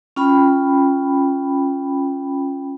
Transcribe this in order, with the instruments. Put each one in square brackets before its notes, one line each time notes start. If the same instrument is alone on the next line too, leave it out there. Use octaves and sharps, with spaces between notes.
[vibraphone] C#4 F4 G5 B5